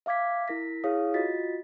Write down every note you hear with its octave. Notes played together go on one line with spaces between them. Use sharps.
E5 F5 D6 G#6 B6
E4 A#4 A#6 B6
E4 G#4 C#5 F5 D#6
F4 F#4 D#5 A6 B6